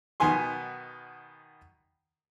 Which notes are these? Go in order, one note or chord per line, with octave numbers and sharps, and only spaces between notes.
B2 D#3 B3 G#5 C6